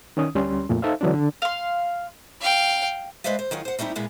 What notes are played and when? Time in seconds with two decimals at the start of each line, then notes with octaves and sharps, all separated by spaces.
0.17 D#3 C#4 D#6
0.35 D2 G3 C#4 C6
0.69 F2 A#2 A3
0.82 D#4 A4 C5 E5 F5
1.01 D3 E3 F#3 C4 D4
1.14 D3
1.42 F5 C6
2.41 F5 G5
3.24 G#3 B4 C5 D5 E5 F5
3.39 C5
3.51 D#3 F#3 F4 G#4
3.65 C5 F#5
3.79 G3 A3 C4 D#4 E4
3.95 A#2 G3 G#3 B3 E4